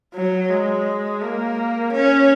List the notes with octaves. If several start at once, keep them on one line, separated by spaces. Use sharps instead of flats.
F#3
G#3
A#3
C#4